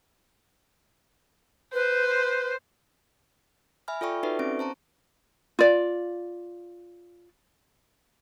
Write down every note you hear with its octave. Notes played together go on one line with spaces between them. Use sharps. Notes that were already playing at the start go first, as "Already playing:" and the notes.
B4 C5
E5 G#5 B5 F6
F4 A4 D5 G5 C#6
D#4 F#4 A4 B4 D5 E5
C4 C#4 C#6 D7
C5 A5 A#5 C#6
F4 D5